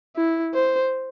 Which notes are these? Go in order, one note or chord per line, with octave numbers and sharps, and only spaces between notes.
E4
C5